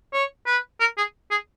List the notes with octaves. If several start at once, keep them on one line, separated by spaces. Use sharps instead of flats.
C#5
B4
A#4
G#4
G#4